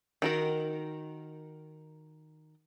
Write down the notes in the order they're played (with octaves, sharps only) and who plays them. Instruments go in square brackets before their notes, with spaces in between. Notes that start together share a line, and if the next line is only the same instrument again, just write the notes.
[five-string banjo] D#3 F#4 A#4